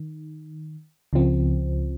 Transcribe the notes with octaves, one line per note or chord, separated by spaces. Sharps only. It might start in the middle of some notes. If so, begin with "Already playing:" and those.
Already playing: D#3
C#2 C#3 F3 C4